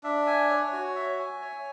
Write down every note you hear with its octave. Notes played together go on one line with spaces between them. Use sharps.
D4 E5
G#5
C#5
F#4
E5
G#5
C#5